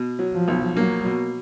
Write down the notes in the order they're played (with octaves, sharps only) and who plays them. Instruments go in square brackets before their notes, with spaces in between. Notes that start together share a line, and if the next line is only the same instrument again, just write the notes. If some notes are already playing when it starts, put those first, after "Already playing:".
Already playing: [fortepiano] B2
F#3
[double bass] F3
[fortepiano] B1
[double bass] F#3 [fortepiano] A#3
[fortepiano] B2